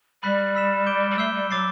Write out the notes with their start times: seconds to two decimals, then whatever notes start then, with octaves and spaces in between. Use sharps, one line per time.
0.23 G3 B5 F#6 B6
0.55 B5 E6 B6 E7
0.86 D6 G6 D7 G7
1.10 G3
1.18 A3 E6 G6 C7 G7
1.34 G3
1.50 F#3 D6 A6 C7